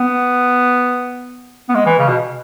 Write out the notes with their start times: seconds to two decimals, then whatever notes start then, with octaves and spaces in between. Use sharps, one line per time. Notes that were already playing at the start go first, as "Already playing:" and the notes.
Already playing: B3
1.69 B3
1.75 G#3
1.86 E3
1.99 C#3
2.09 B2